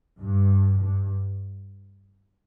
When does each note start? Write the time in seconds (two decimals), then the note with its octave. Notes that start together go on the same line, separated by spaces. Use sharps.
0.19 G2
0.80 G2